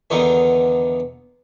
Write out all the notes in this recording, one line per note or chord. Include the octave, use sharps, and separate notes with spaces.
E2 D3 D#3 B3 D#4 F5